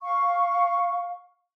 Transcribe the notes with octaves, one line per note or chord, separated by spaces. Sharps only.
F5 C#6